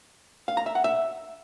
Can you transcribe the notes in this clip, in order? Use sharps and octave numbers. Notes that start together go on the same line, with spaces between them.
F5
A#5
E5
F#5
E5